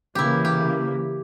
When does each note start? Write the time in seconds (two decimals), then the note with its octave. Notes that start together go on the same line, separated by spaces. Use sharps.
0.15 C#3 E3 A#3 E4 G4
0.45 G4